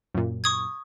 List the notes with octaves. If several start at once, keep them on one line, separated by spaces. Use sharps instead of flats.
F#2 A#2
C#6 D#6 G#6